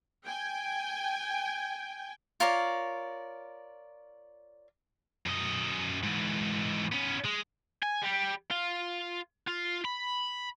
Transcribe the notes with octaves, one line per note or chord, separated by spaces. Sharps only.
G5 G#5
F4 A#4 C#5 D5
F#2 D#5
G#2 E3
B3 C#4
G#3
G#5
G3
F4
F4
B5